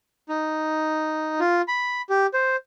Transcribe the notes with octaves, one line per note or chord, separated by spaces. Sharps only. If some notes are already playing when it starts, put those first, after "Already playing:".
D#4
F4
B5
G4
C5